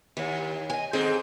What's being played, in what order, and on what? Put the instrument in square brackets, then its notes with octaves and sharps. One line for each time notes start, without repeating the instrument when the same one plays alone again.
[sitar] D#2 [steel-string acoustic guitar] E3 C#5
[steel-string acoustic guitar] D#5 G#5
[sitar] G#2 C4 G#4 [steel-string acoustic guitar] D#3 A4